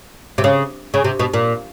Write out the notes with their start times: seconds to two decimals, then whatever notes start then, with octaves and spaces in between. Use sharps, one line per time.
0.38 C3
0.44 C#3
0.94 C#3
1.04 C3
1.19 B2
1.34 A#2